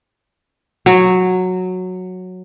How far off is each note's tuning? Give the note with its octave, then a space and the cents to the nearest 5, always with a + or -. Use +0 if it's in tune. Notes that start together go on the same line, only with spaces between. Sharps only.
F#3 -10